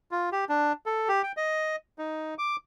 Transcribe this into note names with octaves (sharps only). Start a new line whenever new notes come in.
F4
G4
D4
A4
G4
G5
D#5
D#4
D6